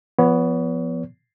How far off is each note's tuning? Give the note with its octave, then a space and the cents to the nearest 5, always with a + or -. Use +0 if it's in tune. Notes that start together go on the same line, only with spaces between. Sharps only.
F3 -15 B3 +0 C#5 +35